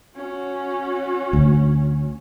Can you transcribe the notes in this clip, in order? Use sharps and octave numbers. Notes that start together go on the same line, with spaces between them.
C#4 F#4
D2